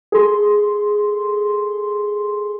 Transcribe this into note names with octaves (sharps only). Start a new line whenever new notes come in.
G#4 A4 C6